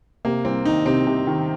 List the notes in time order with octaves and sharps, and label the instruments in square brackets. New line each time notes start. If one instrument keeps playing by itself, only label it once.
[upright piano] C3 [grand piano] A#3
[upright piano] C2 [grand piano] C4
[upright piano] D#3 [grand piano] D#4
[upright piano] C3 [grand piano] C4
[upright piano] C3
D#3